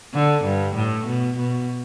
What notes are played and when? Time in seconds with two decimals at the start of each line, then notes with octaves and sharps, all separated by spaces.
0.14 D3
0.44 G2
0.76 A2
1.07 B2
1.38 B2